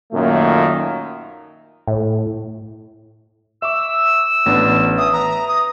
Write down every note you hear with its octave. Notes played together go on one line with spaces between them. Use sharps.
F#2 A#2 D#3 A3 A#3
A2
E5 C#6 D6 E6
A1 B3 D4
E3 E5 D#6
B4 A#5
D#6